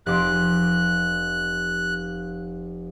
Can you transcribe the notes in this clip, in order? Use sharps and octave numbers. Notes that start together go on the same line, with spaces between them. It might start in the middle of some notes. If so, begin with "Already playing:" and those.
F1 D6 F#6